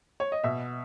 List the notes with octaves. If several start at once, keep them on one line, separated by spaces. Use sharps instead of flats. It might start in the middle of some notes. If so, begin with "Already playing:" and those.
C#5
D#5
B2 E5